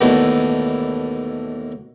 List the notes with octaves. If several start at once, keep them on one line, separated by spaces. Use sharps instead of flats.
D#2 B2 E3 A3 D4